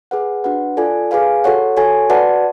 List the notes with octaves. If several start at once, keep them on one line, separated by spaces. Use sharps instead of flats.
G#4 B4 F#5
D4 F#4 B4 F#5
F4 A4 D5 G#5
G#4 B4 F5 G#5
F#4 A4 C#5 F#5
F#4 A4 C#5 G#5
F#4 B4 D5 F#5 A5